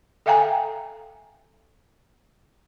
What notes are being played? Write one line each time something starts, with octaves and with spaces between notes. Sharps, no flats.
A4 E5 F5 G5 G#5 A#5